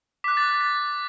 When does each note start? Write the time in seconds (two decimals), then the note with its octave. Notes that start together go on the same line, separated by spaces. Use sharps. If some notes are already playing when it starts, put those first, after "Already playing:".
0.24 D6 F#6 B6
0.37 A6
0.49 A6
0.61 A6